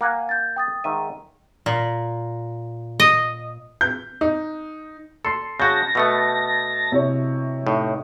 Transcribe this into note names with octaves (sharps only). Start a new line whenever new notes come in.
A#3 F#5 G#5
G6 A6
G5 D#6 A6
G#2 D#3 E5 D#7
A#2
D#5
G6
D#4
A4 C6 C7
C#3 F#4 A5 G6 A#6
B2 A3 B3
C3 E4 C#5
A2 D#4